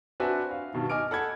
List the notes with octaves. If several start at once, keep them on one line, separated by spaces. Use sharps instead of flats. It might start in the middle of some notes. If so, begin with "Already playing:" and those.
C4 D4 F#4 B4 E5 G#5
F5
G2 B2 D#3
D#5 G#5 D6 F6 D7
A4 F#5 B5 G#6